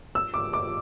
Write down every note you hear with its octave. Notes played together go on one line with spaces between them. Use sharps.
E6
D6
D6